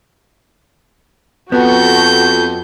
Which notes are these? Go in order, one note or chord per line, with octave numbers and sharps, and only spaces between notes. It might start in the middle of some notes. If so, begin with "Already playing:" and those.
F2 B3 F#4 A4 G6